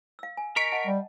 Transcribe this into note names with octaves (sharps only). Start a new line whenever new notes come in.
F5 E6
G#5
A#4 D#5 A#5 C#6 B6 D7
D#5 F#5 A5
G3